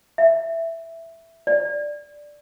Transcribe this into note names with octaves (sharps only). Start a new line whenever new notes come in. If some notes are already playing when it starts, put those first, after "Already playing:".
E5
D5